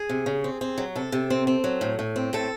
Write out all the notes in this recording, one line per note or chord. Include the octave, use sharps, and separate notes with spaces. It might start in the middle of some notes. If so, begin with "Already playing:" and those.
Already playing: G#4
C3
C#3
C4
C4
F#3
C3 A4
C3
C4
C4
F#3
A2
A2
C4
A2 A4